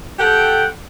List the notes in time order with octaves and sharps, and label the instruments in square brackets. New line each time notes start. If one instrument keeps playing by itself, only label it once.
[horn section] G4 A4 F#5 G5